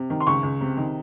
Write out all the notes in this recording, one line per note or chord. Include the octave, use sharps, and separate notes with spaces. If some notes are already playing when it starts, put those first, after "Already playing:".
Already playing: C3
D#3
C6
C#2 C#6
C#2
C3
D#3